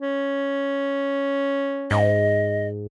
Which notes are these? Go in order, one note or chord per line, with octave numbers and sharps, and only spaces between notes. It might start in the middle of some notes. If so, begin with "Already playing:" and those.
C#4
G#2 D#5